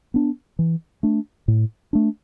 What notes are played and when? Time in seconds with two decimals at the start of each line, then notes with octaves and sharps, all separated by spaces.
0.14 B3 D4
0.59 E3
1.03 A3 D4
1.48 A2
1.93 A3 D4